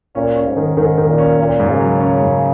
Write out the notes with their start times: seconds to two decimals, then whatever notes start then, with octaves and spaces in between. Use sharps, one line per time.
0.15 A#2 C#4
0.36 C#4
0.47 G#2
0.57 D#3
0.77 G#2 D#3
0.98 D#3
1.08 A#2
1.18 C#4
1.39 A#2 A#3
1.60 G#2
1.70 C#3
1.79 F#3
2.00 C#4
2.21 G#2